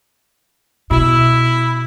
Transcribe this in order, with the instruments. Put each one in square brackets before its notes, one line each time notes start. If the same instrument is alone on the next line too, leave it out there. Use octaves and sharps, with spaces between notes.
[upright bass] B2 [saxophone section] E4